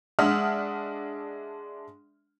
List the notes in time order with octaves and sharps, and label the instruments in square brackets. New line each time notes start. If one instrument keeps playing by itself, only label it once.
[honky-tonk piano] G#3 D4 E5 F#5 D#6 F6